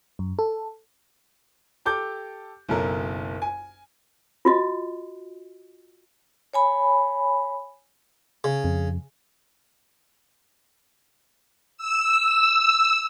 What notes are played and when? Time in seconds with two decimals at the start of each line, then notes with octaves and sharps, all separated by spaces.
0.19 F#2
0.39 A4
1.85 G4 A4 D6 G6
2.69 F#1 B1 A4 A#4
3.42 G#5
4.45 F4 F#4 D#5
6.53 C#5 G#5 B5
8.44 C#3
8.64 F2
11.77 E6